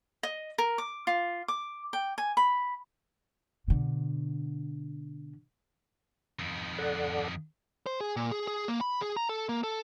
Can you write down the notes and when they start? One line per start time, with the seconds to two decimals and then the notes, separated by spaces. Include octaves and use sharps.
0.23 D#5
0.58 A#4
0.78 D6
1.07 F4
1.48 D6
1.93 G5
2.18 G#5
2.37 B5
3.68 B2 D3
6.39 F2 D#3
6.78 A4 D5 F#5
7.86 C5
8.01 G#4
8.16 A#2
8.31 G#4
8.47 G#4
8.68 A#3
8.81 B5
9.01 G#4
9.17 A#5
9.29 A4
9.49 A#3
9.63 A4